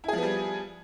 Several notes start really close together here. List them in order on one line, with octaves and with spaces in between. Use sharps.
E4 G#4 F3 B3 G3